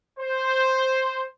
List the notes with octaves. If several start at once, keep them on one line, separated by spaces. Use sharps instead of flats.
C5